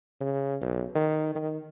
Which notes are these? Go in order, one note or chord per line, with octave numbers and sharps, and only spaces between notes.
C#3
B1
D#3
D#3